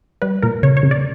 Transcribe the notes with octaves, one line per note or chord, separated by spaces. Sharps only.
G3 B4
A#2 A#4
C#3 C#5
C#5
C#3
D5